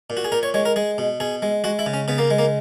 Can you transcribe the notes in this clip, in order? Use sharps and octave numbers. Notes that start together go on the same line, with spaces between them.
A#2
F#4
G#4
A#2 A#4
C#5
G#3 C#5
A#4
G#3 G#4
B2
B2 G#4
G#3
G#3 F#4
E4
C#3
C#4
C#3 B3
A#3
G#3
A#3